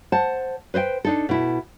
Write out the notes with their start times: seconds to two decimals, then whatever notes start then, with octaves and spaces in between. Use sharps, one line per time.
0.12 C5 F#5 A5
0.74 B4 C5 D#5 G5
1.05 D4 D#4 A4
1.29 B2 E4